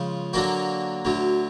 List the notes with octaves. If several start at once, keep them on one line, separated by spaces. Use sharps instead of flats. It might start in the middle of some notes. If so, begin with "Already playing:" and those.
Already playing: C#3 F3 G#3
D3 F#3 A#3 D4 F#4
D2 D3 F#3